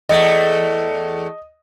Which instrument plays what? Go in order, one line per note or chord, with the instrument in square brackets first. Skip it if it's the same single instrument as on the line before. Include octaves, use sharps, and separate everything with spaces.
[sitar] E2 A3 [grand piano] D#5